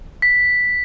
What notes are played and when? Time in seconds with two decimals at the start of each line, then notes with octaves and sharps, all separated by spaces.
0.22 B6